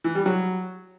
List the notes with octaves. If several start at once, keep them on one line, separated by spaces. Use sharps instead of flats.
E3
G3
F#3